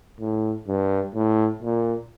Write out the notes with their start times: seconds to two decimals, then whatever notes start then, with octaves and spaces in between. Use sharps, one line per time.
0.20 A2
0.67 G2
1.15 A2
1.62 A#2